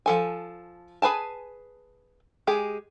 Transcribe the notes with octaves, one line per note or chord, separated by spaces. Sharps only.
F3 A4 G#5
G#4 B4 G#5 A5
G#3 G4 G#4